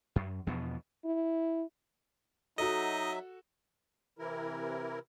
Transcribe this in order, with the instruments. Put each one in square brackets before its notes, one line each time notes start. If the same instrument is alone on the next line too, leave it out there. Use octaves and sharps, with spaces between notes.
[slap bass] F#2
E2 B2 F3 B3
[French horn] E4
[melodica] F#3 E5 [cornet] D#4 [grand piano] F#4 A4 [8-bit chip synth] D#5
[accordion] C3 E3 E4 A#4